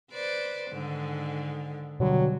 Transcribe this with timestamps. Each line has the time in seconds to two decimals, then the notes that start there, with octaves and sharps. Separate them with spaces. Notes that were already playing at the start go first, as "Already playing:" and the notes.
0.12 B4 C5 D5
0.71 G#2 D3 D#3
2.00 B2 D3 F#3 G3